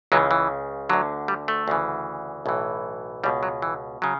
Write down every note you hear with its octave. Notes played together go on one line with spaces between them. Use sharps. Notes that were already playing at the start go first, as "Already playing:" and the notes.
C#2 C#3 E3 F#3
E3
D2 D3 F#3
G3
A3
D2 C#3 E3
B1 A2 E3
C#2 B2 G3
F#3
E3
C#3 F#3